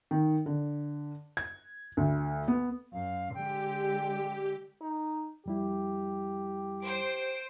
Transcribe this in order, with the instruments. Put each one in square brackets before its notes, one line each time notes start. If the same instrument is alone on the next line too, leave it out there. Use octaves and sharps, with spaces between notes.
[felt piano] D#3
D3
G#6
D2
B3
[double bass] F#2 [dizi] F5
[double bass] D3 G#3 [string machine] G4 [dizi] G5
[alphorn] D#4
[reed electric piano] F2 G3 E4 [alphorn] G4
[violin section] C5 D7